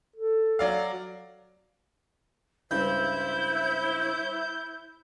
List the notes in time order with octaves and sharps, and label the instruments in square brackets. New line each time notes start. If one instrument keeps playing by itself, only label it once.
[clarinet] A4
[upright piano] F#3 D5 F5
[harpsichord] C#2 G2 G5 [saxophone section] E4 [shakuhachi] C5 [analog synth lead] G6